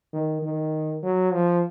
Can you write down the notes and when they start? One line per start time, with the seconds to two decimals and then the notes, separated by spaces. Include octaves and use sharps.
0.13 D#3
0.42 D#3
1.03 F#3
1.33 F3